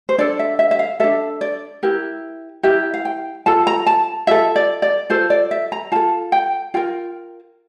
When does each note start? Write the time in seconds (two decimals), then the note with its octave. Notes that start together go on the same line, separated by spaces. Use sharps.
0.09 C5
0.18 D4 A4 D5
0.39 E5
0.59 E5
0.71 E5
0.79 F5
1.00 D4 A4 E5
1.41 D5
1.83 E4 G4 A#4
2.63 E4 G4 A#4 E5
2.94 F5
3.05 G5
3.46 F4 A4 A5
3.67 A#5
3.87 A5
4.27 F4 A4 E5
4.56 D5
4.82 D5
5.10 F4 A4 C5
5.30 D5
5.51 E5
5.72 A#5
5.92 F4 A4 A5
6.32 G5
6.74 F4 A#4 G5